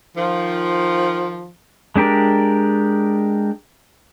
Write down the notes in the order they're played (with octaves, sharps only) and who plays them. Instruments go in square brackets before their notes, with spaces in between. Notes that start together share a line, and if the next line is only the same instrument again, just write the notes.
[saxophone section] D#3 F3
[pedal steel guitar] G#3 D4 G4 A#4 D5